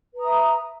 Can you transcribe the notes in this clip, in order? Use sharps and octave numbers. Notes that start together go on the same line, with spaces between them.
B4 E5 A#5 D#6